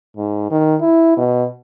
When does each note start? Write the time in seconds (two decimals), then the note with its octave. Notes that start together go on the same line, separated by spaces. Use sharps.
0.16 G#2
0.50 D#3
0.81 E4
1.17 B2